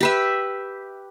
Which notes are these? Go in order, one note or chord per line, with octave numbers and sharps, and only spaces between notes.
G4 B4 E5